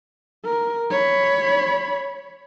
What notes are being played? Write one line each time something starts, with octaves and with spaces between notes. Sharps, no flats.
A#4
C#5 B5